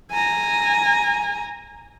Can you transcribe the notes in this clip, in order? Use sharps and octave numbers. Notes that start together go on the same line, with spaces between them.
G#5 A#5